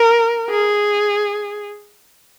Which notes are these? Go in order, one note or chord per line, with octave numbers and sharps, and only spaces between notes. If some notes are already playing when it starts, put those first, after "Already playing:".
Already playing: A#4
G#4